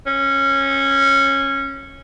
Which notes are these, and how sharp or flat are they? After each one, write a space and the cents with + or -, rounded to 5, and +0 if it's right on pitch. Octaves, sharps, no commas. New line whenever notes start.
C#4 -15